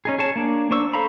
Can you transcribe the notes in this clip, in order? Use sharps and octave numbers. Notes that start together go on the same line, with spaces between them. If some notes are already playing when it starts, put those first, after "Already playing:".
C#4 D#4 G#4
G#4 C#5 A5
A#3 D4
D4 C5 C#6 E6
A4 C5 F5 A#5 B5